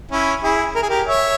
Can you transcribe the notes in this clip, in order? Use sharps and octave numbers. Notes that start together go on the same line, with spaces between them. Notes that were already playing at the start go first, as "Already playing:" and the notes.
C#4 E4
E4 G#4
A#4
G#4
G4 A#4
C#5 E5